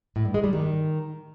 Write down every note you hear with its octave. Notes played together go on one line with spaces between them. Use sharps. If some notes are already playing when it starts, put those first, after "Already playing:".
A2
G2
G#3
G3
D#3